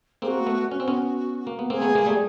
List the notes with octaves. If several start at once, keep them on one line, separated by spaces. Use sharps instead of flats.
A#3 C4 G#4
F#4
A3 B3
C#4 F#4
C4
B3 C#4
A#3
B3
A#3 C4 G#4 A#4
A3 B3
G#3 A#3
G3 A3